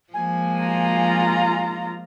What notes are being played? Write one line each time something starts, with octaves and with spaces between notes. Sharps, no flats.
F3 G#3 A#3 G#5
F4 A#5